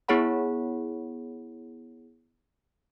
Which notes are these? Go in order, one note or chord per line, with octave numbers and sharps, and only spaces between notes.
B3 E4 G#4 C#5 F#5 B5